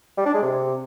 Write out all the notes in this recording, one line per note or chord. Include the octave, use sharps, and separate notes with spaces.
G3
D4
G#3
C3